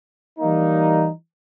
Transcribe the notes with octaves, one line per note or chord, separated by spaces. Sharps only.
E3 G3 A#3 D#4